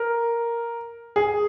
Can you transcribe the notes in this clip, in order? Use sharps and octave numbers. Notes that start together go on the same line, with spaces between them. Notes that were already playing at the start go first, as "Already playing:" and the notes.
Already playing: A#4
G#4